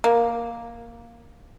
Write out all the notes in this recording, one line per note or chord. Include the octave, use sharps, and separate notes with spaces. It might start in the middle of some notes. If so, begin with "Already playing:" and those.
A#3